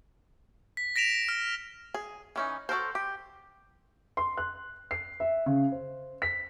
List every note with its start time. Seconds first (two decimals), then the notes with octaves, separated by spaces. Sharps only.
0.77 B6
0.96 A#6 B6 D7 E7 F7
1.29 F6
1.94 G#4
2.36 E3 C#4 D#4
2.69 F#4 A4 A#4 C5
2.95 G4
4.17 C6
4.37 F#6
4.91 C7
5.20 E5
5.46 C#3
5.72 C5
6.22 B6